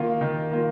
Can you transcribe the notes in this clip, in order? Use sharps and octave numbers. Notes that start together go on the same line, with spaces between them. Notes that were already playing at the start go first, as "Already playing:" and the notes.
Already playing: D#3 A#3 F4
D#3
A#3 F4